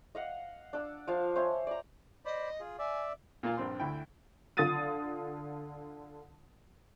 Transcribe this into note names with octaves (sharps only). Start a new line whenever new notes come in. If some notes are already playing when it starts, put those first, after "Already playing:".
D#5 F5 F#5
D4 E6
F3 F5 A5
C5 C#5 E5 G#5
D5 A#5
C5 D5 D#5 B5
F4 G#4
D5 E5 G#5
A#2 A#3 F4 G#5
A#1 G2 C4 C6
D2 E4 G5
D3 F4 D#6 A6 D#7